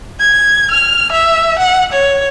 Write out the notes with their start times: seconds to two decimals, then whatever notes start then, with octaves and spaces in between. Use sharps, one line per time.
0.20 G#6
0.71 F6
1.12 E5
1.59 F#5
1.93 C#5